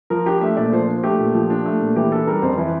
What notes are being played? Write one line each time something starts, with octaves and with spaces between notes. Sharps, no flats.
F3 A#4
D4 G4
A3 E5
A#2 D5
F3 C5
D4
A3 G4
A#2
F3
D4
A3
A#2
E3 G4
D4 A4
G3 A#4
F2 C5
E3